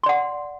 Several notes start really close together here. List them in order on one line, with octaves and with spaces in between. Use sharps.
C6 D5 F#5